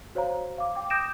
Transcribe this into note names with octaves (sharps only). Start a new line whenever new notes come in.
F#4 C5 C#5 F5 A#5
F5 D6
G5 D6
D6 D#6 G6 A#6 D7 E7